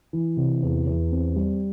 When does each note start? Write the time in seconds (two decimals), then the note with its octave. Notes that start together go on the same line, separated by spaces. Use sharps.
0.13 E3
0.37 C3
0.63 E2
0.87 E2
1.12 C4
1.36 G3